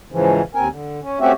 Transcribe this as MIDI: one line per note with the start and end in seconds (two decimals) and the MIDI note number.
0.12 0.42 44
0.12 0.42 49
0.12 0.42 52
0.12 0.42 53
0.55 0.68 39
0.55 0.68 60
0.55 0.68 70
0.55 0.68 80
0.69 1.00 50
1.03 1.20 61
1.20 1.32 57
1.20 1.32 60
1.20 1.32 61
1.20 1.32 66
1.20 1.32 67
1.20 1.32 76